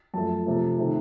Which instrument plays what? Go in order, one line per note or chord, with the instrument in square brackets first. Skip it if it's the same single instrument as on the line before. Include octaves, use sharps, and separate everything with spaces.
[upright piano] F#2 F3 A3 A5
C3 F3 A3
C3 D#3 A3